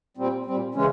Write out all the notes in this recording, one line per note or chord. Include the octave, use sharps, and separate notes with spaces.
A#2 G3 C4
A#2 G3 C4
C#3 E3 G#3 C#4